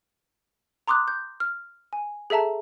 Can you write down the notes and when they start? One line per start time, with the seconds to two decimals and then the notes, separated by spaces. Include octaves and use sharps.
0.88 A#5 C6 D6 D#6 F#6
1.08 G6
1.40 F6
1.93 G#5
2.30 G#4 A4 E5 A5 A#5